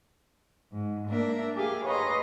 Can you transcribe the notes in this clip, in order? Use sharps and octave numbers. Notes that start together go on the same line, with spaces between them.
G#2
A#3 D4 A#4 E5
G4 G#4 F5
B4 C#5 D#5 A#5 C6